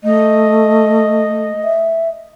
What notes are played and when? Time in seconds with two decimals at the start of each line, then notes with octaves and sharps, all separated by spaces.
0.04 A3 D#5
1.64 E5